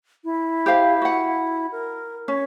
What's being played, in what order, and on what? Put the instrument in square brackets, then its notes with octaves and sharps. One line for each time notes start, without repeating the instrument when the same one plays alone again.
[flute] E4
[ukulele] G4 C5 F5
F#4 F#5
[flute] A#4
[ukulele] C#4 [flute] C#5